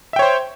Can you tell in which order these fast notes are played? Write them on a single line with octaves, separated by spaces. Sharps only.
E5 G5 C#5 C5